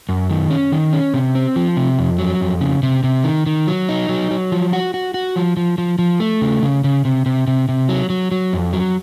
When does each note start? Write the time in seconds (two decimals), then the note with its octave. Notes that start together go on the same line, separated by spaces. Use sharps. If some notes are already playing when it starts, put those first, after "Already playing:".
0.09 F#2
0.30 D#3
0.50 C#4
0.72 D#3
0.93 C#4
1.14 C3
1.35 C4
1.56 F3
1.77 C3
1.99 F2
2.19 F#3
2.41 F2
2.61 C#3
2.83 C3
3.04 C3
3.24 D#3
3.46 D#3
3.68 F#3
3.89 D#4
4.09 F#3
4.31 F#3
4.52 F3
4.73 F#4
4.94 F#4
5.14 F#4
5.36 F3
5.57 F3
5.78 F3
5.99 F3
6.20 A3
6.41 C#3
6.62 C#3
6.84 C#3
7.05 C3
7.26 C3
7.48 C3
7.69 C3
7.89 F#3
8.10 F#3
8.31 F#3
8.53 F2
8.73 F#3